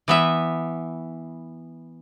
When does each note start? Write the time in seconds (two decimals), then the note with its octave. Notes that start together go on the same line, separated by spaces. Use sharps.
0.08 E3 B3 E5